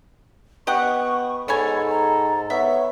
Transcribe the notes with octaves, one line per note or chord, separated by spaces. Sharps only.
B3 G4 D#5 F#5 C#6
G#2 B3 A4 C#5 G#5 B5
A#5
B3 C#5 E5